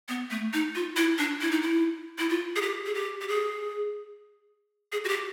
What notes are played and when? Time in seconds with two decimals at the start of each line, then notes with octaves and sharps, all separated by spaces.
0.09 B3
0.31 A3
0.53 D#4
0.75 F4
0.96 E4
1.18 D4
1.41 E4
1.51 D#4
1.62 E4
2.19 E4
2.29 F4
2.56 G#4
2.62 G4
2.86 G#4
2.95 G4
3.21 G4
3.28 G#4
4.92 G#4
5.04 F#4
5.09 G4